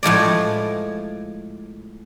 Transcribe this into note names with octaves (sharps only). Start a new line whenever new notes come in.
A2 F3 G#3 D5